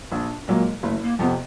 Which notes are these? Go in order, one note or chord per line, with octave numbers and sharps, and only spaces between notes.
A#1 D4
A#2 F#3 G#3 A#3
F#1 A3
A#3
F2 C3 B3